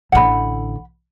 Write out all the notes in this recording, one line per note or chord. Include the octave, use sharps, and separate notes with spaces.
A1 D3 F#5 B5